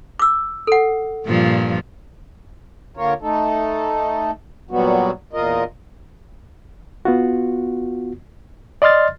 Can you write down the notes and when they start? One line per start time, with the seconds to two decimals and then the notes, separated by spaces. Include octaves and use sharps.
0.19 D6 E6
0.67 A4 F#5
1.26 G2 A#2 F3
2.97 D3 A#3 F4 A#4 C#5
3.22 A3 D#4 A4
4.71 A#2 F#3 G3 B3 F#4
5.33 E2 A#2 F4 A#4 D#5
7.05 B3 F4 F#4
8.82 D5 D#5 C6 F6 A6